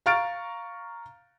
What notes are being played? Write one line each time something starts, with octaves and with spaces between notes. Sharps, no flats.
F5 A#5 C#6 F6 A6 D7